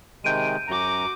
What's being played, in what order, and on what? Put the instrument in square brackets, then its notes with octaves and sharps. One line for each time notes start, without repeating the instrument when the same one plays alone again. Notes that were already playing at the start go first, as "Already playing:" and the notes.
[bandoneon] C3 D#3 G#3 [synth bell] G6 D7 D#7
[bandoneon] F#2 A#5 [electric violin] F#4 D6